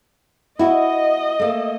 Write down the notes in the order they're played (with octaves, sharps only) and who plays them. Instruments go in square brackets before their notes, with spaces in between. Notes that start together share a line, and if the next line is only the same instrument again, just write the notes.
[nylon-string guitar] E4 F#4 [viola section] D#5
[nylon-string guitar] A3 A#3